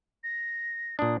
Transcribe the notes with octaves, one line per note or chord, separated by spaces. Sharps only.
A#6
A#2 D4 D#6